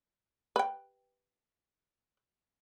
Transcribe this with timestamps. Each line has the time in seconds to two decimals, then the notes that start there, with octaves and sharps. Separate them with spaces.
0.56 B4 G5